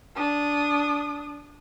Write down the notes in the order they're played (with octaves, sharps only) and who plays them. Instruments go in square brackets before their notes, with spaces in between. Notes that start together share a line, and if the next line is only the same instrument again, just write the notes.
[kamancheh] D4 D#6